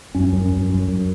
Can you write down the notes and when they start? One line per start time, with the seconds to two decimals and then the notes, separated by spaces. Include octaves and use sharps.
0.15 F#2 C#4
0.33 F#2
0.52 F#2
0.70 F#2
0.88 F#2